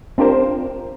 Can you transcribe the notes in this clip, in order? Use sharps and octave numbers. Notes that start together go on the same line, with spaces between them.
C4 D4 F4 G4 A#4 C5